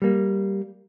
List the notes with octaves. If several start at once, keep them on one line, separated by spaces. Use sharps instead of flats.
G3 A#3